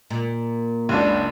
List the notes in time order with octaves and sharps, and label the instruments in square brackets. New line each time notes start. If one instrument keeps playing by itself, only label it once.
[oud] A#2
[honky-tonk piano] F#1 C#2 D4